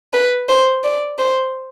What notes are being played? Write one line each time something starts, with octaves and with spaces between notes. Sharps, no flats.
B4
C5
D5
C5